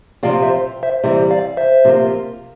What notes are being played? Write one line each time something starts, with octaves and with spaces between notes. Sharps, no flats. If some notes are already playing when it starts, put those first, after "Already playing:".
C3 F3 C4 F4 D5 F5
C5 E5
C5 E5
C3 E3 G3 C5 E5
D5 F5
C5 E5
C3 F3 A#3 F4